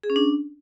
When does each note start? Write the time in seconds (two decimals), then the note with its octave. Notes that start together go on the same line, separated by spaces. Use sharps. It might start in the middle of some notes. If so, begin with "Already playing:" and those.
0.04 G#4
0.10 C#4
0.16 D4